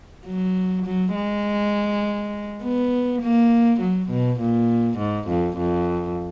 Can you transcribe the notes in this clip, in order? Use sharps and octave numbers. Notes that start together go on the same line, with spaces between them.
F#3
F#3
G#3
B3
A#3
F#3
B2
A#2
G#2
F2
F2